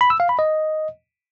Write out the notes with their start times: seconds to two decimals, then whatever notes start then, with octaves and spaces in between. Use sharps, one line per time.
0.01 B5
0.10 E6
0.20 F5
0.29 B5
0.39 D#5